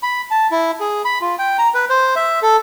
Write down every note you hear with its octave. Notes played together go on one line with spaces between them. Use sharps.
B5
A5
E4
G#4
B5
F4
G5
A#5
B4
C5
E5
A4